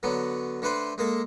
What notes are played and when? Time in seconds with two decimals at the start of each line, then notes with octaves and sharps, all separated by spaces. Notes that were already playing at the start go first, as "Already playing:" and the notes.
0.03 D3 F#3 B3
0.62 D3 A3 B4 C5
0.98 G#3 A#3 A4